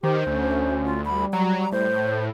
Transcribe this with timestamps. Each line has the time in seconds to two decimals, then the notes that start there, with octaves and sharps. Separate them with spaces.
0.03 D#3 G4 C5
0.27 D2 C#4
0.85 F4
1.05 G3 B5
1.33 F#3 A#5
1.72 A2 C5